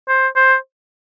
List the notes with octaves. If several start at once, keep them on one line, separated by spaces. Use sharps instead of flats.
C5
C5